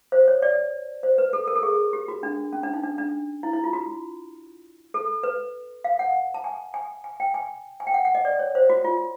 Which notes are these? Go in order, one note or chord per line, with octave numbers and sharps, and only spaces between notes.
C5
C#5
D5
C5
B4
A4
A#4
A4
G#4
G4
F#4
D4
C#4
D4
D#4
D4
D4
E4
E4
F4
F#4
A4
B4
F5
F#5
A5
G#5
G#5
G#5
G5
G#5
G#5
G5
F#5
F#5
D#5
D5
C#5
C5
F#4
F4